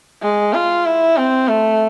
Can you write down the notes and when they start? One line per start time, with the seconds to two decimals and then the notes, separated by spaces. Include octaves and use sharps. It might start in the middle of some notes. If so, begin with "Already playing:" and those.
0.22 G#3
0.54 F4
0.86 E4
1.17 C4
1.48 A3